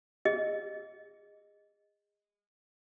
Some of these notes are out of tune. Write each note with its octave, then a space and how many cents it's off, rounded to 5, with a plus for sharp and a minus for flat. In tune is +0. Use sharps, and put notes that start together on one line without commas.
G#4 -30 D#5 +0